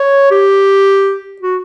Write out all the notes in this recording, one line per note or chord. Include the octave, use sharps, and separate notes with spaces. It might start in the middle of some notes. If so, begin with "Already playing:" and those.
Already playing: C#5
G4
F#4